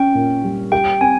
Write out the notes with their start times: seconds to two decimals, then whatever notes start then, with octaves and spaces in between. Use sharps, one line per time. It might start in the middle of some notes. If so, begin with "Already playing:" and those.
Already playing: C#4 G5
0.15 A#2
0.44 G3
0.72 G4 G5
1.01 C4 G#5